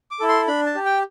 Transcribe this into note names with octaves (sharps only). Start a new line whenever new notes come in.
D6
E4 A4
C6
D4 B5
A5
G4
G5